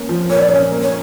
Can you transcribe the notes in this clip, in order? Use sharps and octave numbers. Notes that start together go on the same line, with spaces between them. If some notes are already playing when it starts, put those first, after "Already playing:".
Already playing: A#3 C#4
F3
A#2 C#5
D5
C#4 C#5
A#3
C#5